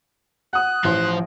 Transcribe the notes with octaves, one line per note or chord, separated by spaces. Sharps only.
F#5 D#6 F#6
A1 F3 C5 C6